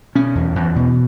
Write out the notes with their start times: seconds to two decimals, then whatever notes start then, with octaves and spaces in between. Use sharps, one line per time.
0.15 B2 C#4
0.35 E2
0.56 E2
0.76 B2